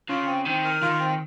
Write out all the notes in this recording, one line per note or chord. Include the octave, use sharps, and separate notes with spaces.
C#3 F4
C4
D#3 C4
A#4
D#3 F4
C4